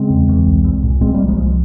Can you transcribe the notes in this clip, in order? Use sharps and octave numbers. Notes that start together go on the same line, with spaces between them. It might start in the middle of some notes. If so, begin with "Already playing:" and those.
Already playing: C#3 G#3 C4
E2
E2
C2
C2
A#2
A#2 G#3 C4
C2 G3 A#3
F3 G#3
C2